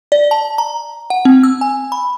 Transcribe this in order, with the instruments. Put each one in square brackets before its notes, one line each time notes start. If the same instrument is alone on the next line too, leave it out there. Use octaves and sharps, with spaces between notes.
[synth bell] D5
A5
A#5
F#5
C4
E6
G#5
B5